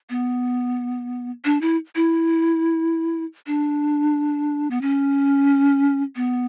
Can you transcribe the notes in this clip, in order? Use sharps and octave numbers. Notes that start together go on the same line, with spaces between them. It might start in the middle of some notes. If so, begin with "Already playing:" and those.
B3
D4
E4
E4
D4
B3
C#4
B3